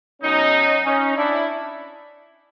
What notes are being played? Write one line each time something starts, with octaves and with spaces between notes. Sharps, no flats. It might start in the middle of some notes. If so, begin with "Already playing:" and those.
B2 F#3 C#4 D#4
C#4 D#4
D4 E4